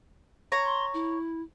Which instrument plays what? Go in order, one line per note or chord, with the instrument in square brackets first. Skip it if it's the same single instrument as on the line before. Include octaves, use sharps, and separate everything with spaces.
[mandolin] C#5 A#5
[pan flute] C6
E4